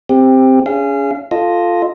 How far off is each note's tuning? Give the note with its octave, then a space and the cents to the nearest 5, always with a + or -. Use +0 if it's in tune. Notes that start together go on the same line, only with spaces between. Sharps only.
C4 +0 G4 +15
C#4 +35 G#4 -5 F5 -30
F4 +0 A4 +0 D#5 +0